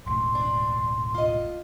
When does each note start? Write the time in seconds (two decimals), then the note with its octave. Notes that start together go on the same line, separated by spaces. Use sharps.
0.06 E1 A1 D2 C6
0.35 D4
1.15 F4 D#5